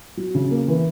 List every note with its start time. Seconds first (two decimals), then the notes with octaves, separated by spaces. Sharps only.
0.17 F#3
0.35 C#3
0.51 A#3
0.68 E3